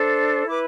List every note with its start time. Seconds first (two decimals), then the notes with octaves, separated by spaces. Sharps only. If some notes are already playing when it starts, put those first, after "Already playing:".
Already playing: D4 A4 C5
0.48 E4 B4 D6